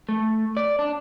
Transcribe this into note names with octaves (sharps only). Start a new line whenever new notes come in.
A3
D5
D4